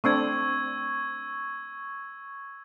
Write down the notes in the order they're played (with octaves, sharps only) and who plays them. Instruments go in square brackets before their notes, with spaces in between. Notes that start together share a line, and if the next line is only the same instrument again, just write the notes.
[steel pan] A3 C4 D4 [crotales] C#6 E6 G#6